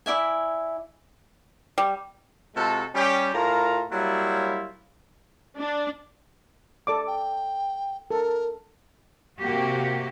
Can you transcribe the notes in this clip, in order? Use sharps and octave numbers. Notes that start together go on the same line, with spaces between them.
E4 D5 E5 G#5
G3
C3 G#3 F4 F#4 A4
G3 C#4 G4
A2 F4 A#4 A#5
F#3 G3 A#3 E4 F4 C#5
D4
A4 D5 D6
G5
A4 A#4
C3 A#3 F#4 G4